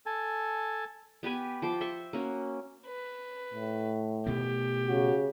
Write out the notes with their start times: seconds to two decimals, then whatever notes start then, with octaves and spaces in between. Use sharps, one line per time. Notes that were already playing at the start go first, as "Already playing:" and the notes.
0.06 A4 G#5 A5
1.23 B3 G4 B4 G#5
1.62 F3 C5 G5 D6
1.81 C5 E5 C6 C#6
2.13 A#3 C#4 F#4
2.87 B4
3.54 A2
4.26 B2 A3 G4
4.88 C#3 F#4